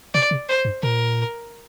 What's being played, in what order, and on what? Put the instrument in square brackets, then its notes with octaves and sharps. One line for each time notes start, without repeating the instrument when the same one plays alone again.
[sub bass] C3 [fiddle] D5
[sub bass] C3
[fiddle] C5
[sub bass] G2
[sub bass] A#2 [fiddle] A#4